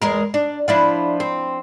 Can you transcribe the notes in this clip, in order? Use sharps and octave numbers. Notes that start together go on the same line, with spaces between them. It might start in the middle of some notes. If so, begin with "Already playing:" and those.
E2 G#3 A#4
D4
F3 D4 E4
C4